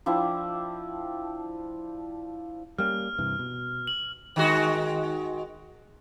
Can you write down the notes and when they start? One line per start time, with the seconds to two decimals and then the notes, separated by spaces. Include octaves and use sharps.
0.06 F3 D4 E4 G5
2.78 G3 A#3 C#4 F6
3.18 G2 C3 E3
3.39 B2
3.87 F#7
4.36 D#3 G#3 F#4